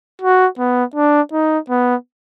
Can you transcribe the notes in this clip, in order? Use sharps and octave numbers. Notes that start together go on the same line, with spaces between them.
F#4
B3
D4
D#4
B3